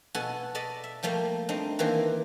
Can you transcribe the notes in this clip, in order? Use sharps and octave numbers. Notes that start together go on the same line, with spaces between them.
B2 F#4 A4 F#5 G#5
A4 D5 D#5 A5 B5
E5
F3 G3 A3 A#3
A3 C4 D4 D#4
D#3 E3 A3 A#3 C4 G4